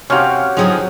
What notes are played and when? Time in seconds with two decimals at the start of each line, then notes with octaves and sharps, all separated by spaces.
0.10 C3 C#4 F#4 G4 F5
0.57 D3 F3 F#3 C4 D#4 G#4